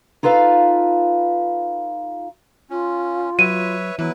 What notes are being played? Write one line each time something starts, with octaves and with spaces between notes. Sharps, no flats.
D#4 F4 A4 B4 F5
C#4 F4
F#3 B4 C#5 E5 D#7
E3 F#3 B3 E4 B4